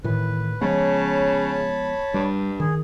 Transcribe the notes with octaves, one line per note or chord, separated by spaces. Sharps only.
A2 D#3 E3 B4
C#3 F3 G#3 B3 C#5 A5 B5
G2 G3
D#3 G#4